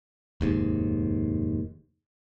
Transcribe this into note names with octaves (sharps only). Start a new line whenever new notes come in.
F1 D#2 G#2